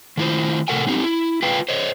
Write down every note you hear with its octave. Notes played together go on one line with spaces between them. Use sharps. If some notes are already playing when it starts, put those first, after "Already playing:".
D#3 A3 E4 F4 C5
A2 C3 A4 A#4 F#5 G#5
B3 C4 D#4 G4
E4
F4 B4 F5 G5
C5 C#5 D#5